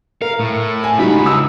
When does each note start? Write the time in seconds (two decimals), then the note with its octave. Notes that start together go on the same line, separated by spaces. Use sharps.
0.21 A#4 F5
0.40 A2
0.84 G#5
0.98 C#2 G3 D#4 F#4 B5
1.26 E6